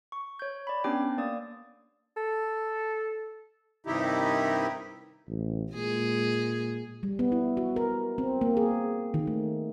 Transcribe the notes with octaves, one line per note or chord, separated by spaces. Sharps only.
C#6
C#5 G6
D5 B5
B3 C#4 D4 G4 G5
A#3 D5 D#6
A4
G2 C3 D#3 D#4 E4 G4
A1
A#2 G#3 G#4
G3
B3
E4
F#4
A#4
C4
A#3
G#4
D#3
A3